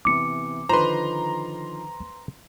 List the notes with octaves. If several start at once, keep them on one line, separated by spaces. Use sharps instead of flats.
C3 E3 B3 D6 C#7
D3 D#3 F3 B4 C5 A#5 C6